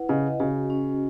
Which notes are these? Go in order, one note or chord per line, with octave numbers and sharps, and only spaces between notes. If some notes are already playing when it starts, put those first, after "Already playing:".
Already playing: E4 B4 F#5
C#3 D#5
C#3 F#4
C#4